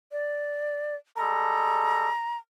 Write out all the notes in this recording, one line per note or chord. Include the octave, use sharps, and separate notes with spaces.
D5
G3 G#3 A4 A#5